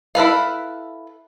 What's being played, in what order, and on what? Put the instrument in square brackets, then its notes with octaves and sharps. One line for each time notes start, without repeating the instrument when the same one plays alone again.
[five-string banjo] E4 A4 B4 F5